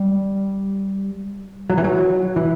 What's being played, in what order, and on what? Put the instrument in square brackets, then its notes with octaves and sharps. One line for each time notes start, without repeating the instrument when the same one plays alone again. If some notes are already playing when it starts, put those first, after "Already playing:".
Already playing: [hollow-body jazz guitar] G3
F#3
E3
F#3
E3